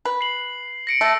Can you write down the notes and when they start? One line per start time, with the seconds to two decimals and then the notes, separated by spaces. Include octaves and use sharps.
0.05 B4
0.21 C7 F#7
0.87 A#6 C#7 D7
1.01 A3 E6 A#6